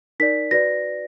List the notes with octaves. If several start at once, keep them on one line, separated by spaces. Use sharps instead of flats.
D#4 A#4 D5 B6
F#4 B4 D5 A#6